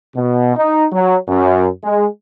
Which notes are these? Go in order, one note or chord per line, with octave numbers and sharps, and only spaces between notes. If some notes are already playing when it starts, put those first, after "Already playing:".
B2
D#4
F#3
F#2
G#3